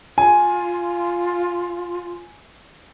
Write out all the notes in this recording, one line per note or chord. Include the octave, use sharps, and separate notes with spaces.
F4 G#5